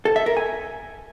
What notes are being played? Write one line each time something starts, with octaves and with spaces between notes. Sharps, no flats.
A4
E5
A#4
G#5